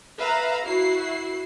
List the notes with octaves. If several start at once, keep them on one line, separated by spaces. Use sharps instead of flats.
B4 E5 F5 A#5
E4 F#4 C7